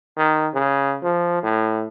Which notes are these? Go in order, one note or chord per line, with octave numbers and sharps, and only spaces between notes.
D#3
C#3
F3
A2